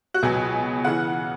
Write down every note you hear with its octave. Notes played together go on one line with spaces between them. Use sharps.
F#4
C#2 B2 F#3 B3 G#4
C#3 E3 F#5